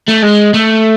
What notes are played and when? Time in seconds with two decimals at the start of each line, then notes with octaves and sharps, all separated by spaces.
0.08 A3
0.23 G#3
0.54 A3